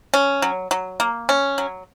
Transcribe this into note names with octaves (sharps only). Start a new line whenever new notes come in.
C#4
F#3
F#3
A#3
C#4
F#3